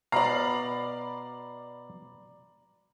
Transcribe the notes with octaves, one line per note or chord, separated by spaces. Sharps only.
B2 D5 F5 A#5 B5 C7